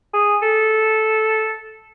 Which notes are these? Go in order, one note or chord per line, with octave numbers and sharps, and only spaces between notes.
G#4
A4